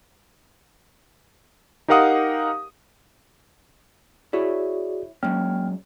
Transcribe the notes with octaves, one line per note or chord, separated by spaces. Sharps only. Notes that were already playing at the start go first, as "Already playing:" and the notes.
D#4 G4 A#4 F5 F#5 D#6
E4 F#4 G#4 C#5 D5
F#3 G#3 A#3 C#4 G5 F6